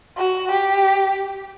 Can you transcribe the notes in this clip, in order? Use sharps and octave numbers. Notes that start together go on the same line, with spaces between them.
F#4
G4